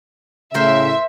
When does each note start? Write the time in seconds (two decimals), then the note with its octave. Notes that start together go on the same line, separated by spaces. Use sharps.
0.54 A2 C#3 A#4 C5 E5